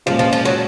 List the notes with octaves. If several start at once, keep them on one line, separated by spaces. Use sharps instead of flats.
A#2 F3 G#3 C#4 F4
F3
F3
F#3